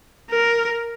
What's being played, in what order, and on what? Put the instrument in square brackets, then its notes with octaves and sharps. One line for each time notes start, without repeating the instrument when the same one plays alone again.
[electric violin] A#4